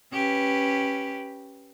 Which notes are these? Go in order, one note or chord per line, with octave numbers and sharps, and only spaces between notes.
C#4 G4 B4